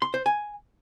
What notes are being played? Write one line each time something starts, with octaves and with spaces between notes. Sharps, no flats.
C6
C5
G#5